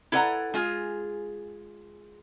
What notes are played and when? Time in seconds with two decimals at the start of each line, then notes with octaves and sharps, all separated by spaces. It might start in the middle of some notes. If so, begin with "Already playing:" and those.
0.12 E4 A4 B4 D5 F#5 A#5
0.54 G#3 F4 G#4